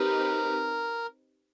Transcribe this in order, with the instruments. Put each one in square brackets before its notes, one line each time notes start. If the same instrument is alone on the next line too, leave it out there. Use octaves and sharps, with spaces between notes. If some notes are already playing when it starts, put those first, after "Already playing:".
Already playing: [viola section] C4 D#4 G4 B4 [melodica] A#4